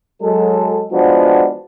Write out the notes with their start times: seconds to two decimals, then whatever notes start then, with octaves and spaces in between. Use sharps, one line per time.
0.22 F#3 G#3 A4
0.91 E3 F3 G#3 B3 D4 F#4